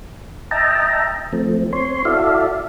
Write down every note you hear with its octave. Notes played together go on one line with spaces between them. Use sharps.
D#5 E5 G5 A5 A#5
F3 A3 C4
C4 C#5 C6
E4 F#4 A4 D5 E5 F5